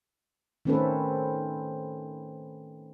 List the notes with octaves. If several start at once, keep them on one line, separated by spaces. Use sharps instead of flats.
D#3 A3 C4 C#4 A4 B4